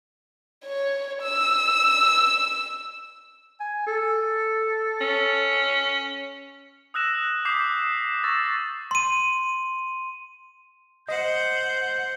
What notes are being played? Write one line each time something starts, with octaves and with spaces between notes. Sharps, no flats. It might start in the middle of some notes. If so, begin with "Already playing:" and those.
C#5
E6
G#5
A4
C#4
D#6 E6 F#6 A#6 E7
D6 D#6 G6 B6 C7
C#6 E6 A6 A#6 E7
C6 D#7
C5 D#5 F#5 G6